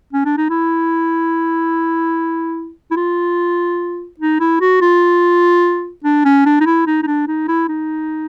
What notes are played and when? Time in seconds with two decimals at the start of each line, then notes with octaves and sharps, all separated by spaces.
0.13 C#4
0.25 D4
0.37 D#4
0.50 E4
2.91 E4
2.97 F4
4.20 D#4
4.40 E4
4.61 F#4
4.81 F4
6.05 D4
6.25 C#4
6.46 D4
6.61 D#4
6.66 E4
6.87 D#4
7.03 D#4
7.07 D4
7.28 D#4
7.48 E4
7.69 D#4